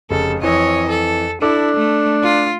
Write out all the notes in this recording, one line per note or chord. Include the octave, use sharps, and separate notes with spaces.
F1 C#3 A4
F2 E3 C#5 D#5
A4
D4 E4 A4 D6
A3
F4